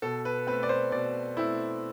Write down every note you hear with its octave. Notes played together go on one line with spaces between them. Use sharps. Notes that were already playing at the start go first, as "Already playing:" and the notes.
B2 A4
B4
A3 C4 B4
D5
C5
B2 D5
A3 C4 E4